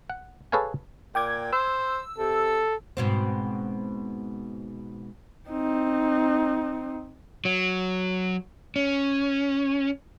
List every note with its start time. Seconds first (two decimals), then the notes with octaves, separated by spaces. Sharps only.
0.10 F#5
0.52 G#4 A4 B4 C#5 F5 G#5
1.15 A#2 G5 D6 G#6
1.52 C5 E6
2.18 C3 A4
2.97 G#2 B2 C4
5.49 C4 D#4
7.45 F#3
8.76 C#4